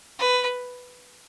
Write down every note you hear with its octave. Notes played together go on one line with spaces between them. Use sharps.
B4